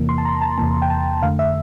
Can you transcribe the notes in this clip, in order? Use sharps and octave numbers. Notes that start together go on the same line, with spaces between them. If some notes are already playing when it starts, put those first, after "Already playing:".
Already playing: E2 C3 E3 A#3
C6
A5
A#5
A5
E2 C3 E3 A#3 A5
G5
A5
F2 D3 A3 F5
E5